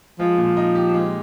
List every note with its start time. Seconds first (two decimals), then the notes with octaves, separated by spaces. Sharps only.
0.19 F3 G#3
0.38 A#2
0.57 D#4
0.75 G4
0.94 G#3